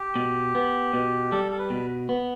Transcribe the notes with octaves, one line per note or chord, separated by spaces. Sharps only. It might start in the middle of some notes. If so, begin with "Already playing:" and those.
Already playing: G4
B2
B3
B2
G3 A4
A4
B4
B2
B3